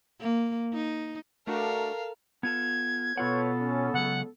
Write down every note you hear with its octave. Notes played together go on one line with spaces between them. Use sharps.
A#3
D#4
A3 D4 F#4 A4 A#4 F5
B3 F4 A4 G#6
B2 B3 F4 A4 B4 C#5 F#5
C#4
C#2 C#3 F#3 F#5